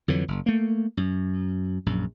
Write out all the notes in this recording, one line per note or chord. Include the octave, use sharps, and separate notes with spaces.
F2 D3 E3 F#3
F#1
A3 A#3
F#2
A#1 F#2